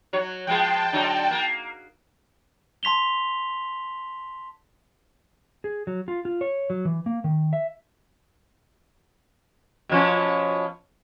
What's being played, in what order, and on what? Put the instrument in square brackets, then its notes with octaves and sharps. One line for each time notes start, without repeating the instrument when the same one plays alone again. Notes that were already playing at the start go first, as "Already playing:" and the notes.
[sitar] F#3 C#5
[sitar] F3 G#3 B3 [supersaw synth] G5 A5
[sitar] D3 F#3 D#4
A#3
[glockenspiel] A5 C6 B6 F7 G7
[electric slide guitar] G#4
F#3
F4
F4
C#5
F#3
E3
A#3
D#3
E5
[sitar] B2 F3 C#4